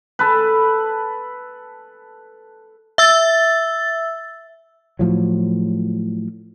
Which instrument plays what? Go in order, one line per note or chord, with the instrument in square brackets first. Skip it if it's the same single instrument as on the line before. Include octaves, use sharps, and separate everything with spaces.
[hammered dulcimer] A4 B4
[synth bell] E5 E6 A6
[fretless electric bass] A2 F3 F#3